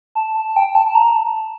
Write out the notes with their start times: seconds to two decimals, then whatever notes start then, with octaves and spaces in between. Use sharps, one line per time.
0.15 A5
0.36 A5
0.56 G5
0.75 A5
0.88 A5
0.95 A#5
1.16 A5